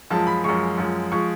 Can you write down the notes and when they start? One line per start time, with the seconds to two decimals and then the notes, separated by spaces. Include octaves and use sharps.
0.10 F#2 F3 G#3 A5
0.27 B5
0.44 F#2 F3 G#3 C#6
0.78 F#2 F3 G#3
1.12 F3 G#3 C#6